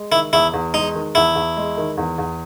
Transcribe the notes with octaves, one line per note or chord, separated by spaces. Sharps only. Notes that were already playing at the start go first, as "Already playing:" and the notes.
Already playing: G#3
D#3 E4
E2 E4
E2
G#3 D#4
D#3
E2 E4
E2
G#3
D#3
E2
E2